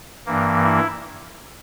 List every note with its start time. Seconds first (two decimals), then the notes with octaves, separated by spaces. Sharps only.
0.27 G2 E3 A#3
0.64 E4